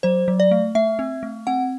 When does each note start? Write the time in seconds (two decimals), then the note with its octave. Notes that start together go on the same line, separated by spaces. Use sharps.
0.03 F#3 C5
0.28 F#3
0.40 D5
0.51 A3
0.75 A3 E5
0.99 C4
1.23 A3
1.47 C4 F#5